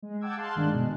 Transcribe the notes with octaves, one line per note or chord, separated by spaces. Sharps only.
G#3
F#5 G5 A5 D6 E6 G#6
G#4 F5 A5 C6 F#6
G1 D#3 G#3 D4 F#6
B2 G#3